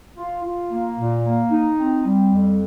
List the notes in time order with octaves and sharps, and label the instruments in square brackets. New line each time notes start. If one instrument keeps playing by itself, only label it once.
[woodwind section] F4
F4
A#3
A#2
A#3
D#4
C4
G3
F2